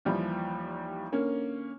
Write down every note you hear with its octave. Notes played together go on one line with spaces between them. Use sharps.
D#2 E3 F3 G3
D3 A#3 C#4